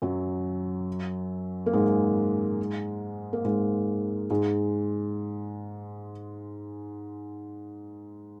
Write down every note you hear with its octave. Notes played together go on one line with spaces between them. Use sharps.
F#2 F#3
A#3
G#2 G#3
A#3
G#2 G#3
G#2 G#3